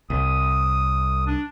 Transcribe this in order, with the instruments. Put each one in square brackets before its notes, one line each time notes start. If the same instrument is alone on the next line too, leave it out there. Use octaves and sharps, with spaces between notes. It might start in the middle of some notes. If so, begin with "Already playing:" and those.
[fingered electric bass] C2 [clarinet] D#6
[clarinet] D4